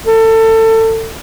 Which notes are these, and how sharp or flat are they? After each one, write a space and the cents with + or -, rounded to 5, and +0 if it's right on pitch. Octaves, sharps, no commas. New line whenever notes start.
A4 +25